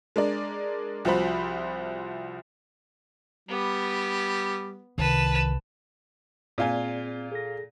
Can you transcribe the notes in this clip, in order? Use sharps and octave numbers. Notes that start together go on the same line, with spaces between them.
G#3 D4 A#4 D5
C2 F3 F#4 C5 B5
G3 B3
C2 D#3 B4 A5
A#2 C4 F4 G#4 D5 G#5
G#4 A4 A#6